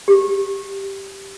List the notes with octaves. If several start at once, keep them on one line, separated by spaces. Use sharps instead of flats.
G4